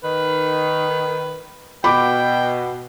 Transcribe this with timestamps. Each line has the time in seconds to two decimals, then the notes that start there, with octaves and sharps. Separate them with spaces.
0.04 D#3 B4
1.84 B2 G5 B5 D6